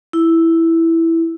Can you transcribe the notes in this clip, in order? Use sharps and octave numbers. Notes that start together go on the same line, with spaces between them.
E4